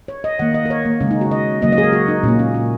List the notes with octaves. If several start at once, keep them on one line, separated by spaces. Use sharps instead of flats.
C#5
D#5
D#3 A#3 F#5
D#5
A#4
C#5
A#3
C#3 G#3 C#4
D#4
F#4
D#5
C#3 F#3 A#3 D#5
D#5
G#4
A#4
F#4
D#4
A#2 A#3 C#4
C#4
C#4